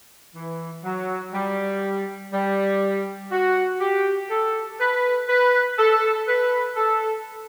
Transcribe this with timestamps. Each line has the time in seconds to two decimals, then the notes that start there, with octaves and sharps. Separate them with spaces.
0.35 E3
0.84 F#3
1.33 G3
2.33 G3
3.31 F#4
3.80 G4
4.30 A4
4.80 B4
5.28 B4
5.78 A4
6.27 B4
6.76 A4